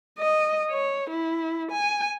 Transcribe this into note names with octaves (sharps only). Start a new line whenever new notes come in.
D#5
C#5
E4
G#5